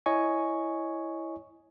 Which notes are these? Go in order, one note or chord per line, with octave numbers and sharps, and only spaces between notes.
E4 C#5 D#5 G#5 C#6